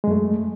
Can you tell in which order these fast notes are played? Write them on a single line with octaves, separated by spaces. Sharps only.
G#3 F#2 A3